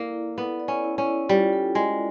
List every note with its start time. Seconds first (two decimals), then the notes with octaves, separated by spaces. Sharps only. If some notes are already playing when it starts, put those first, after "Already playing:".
Already playing: A#3 E4 A4 D5
0.14 E4
0.38 B3 A4
0.60 D5
0.68 C#4
0.84 E4
0.98 C#4
1.06 E4
1.29 G3 F4
1.53 A4
1.75 G#3 D5